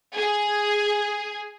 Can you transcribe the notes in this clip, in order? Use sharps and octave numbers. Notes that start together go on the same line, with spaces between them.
G#4